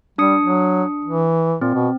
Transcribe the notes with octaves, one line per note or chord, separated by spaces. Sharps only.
G3 D4 D#6 C#7
F#3
E3
A#2 C4
B2